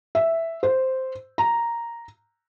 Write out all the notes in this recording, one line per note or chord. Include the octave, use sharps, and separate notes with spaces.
E5
C5
A#5